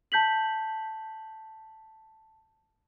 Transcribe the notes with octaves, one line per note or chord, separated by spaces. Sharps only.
A5 G6 B6 F#7